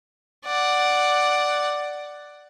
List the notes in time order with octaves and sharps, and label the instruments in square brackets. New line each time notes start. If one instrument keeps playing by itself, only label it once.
[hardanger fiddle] D5 F#5